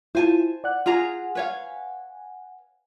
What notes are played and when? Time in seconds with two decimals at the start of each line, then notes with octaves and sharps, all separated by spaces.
0.15 E4 F4 C5 G#5 A5
0.64 D5 F#5 F#6
0.86 F4 G#4 F#5 G#5 A#5
1.35 B4 C#5 F5